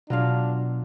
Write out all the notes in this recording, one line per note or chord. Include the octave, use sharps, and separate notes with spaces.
B2 F#3 D4 F4 F5